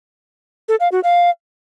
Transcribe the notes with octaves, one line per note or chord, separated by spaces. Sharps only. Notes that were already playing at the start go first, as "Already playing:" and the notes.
A4
F5
F#4
F5